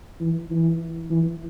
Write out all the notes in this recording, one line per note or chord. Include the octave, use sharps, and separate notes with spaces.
E3
E3
E3